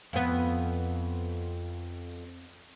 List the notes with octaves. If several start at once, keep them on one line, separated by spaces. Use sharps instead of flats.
F2 B3